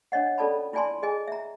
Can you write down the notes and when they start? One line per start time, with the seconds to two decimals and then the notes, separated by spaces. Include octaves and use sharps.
0.12 D4 C#5 D#5 F#5
0.38 C#4 F4 A4 D5 A5 B5
0.73 E4 F4 D5 G#5 A5 C6
1.02 G#4 D#5 G#5
1.28 E5 A#5